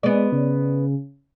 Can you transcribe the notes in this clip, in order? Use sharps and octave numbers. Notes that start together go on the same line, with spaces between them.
G#3 B3 D5
C#3